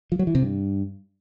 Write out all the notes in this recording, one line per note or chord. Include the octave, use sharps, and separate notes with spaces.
F3
F#3
E3
C3
G2